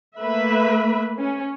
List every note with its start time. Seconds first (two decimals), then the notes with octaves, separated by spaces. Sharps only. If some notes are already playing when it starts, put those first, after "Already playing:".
0.19 A3 A#3 B4 E5 B5
1.17 C#4